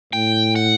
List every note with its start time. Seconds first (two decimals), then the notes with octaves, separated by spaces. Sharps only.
0.13 A2 G5
0.56 F#5